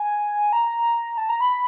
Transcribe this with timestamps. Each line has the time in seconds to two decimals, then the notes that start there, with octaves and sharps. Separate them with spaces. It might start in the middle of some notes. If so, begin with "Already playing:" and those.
Already playing: G#5
0.53 A#5
1.18 A5
1.29 A#5
1.41 B5